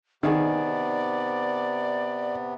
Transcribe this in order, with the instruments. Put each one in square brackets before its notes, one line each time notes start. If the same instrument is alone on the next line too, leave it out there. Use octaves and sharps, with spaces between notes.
[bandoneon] C3 B3 [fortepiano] D#3 G#4 [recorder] D5